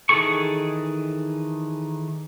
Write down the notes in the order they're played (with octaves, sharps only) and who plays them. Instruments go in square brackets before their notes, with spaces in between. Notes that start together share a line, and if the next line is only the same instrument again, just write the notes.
[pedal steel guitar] D#3 E3 G#4 A4 C#6